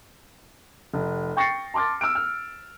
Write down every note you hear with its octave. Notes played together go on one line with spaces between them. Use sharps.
F1
G5 C#6 A6 A#6 C7 C#7
A5 C6 D6 F6 A6
E6 F6 D7
F6